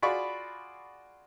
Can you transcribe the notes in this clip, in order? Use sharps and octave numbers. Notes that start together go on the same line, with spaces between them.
F4 F#4 G#4 D5 B5 C#6